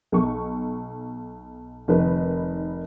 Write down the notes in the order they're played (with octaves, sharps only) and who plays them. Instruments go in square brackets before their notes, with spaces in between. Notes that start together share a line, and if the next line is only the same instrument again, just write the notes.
[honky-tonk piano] B1 C#6
F1 D#3 B4